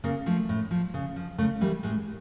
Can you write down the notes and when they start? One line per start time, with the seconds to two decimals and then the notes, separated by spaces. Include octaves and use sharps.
0.04 C#3 A#3
0.26 F3 A3
0.49 A2
0.71 F3
0.94 C#3
1.16 F3
1.38 C#3 A3
1.61 E3 G3 A#3
1.83 A2 G#3